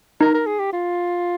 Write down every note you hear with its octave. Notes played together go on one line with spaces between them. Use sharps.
D#4 A#4
A#4
G#4
G4
F4